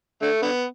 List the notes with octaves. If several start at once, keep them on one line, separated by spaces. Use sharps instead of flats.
D3 A3
D3 B3